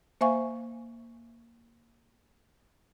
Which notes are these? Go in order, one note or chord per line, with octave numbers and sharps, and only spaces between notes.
A#3 C5 E5 F5 G#5 C#6